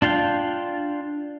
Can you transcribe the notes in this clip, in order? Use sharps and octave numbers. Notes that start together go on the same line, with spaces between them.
D4 F4 F5 G5